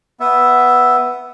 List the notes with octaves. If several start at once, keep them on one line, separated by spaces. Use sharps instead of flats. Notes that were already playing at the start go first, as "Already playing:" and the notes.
B3 E5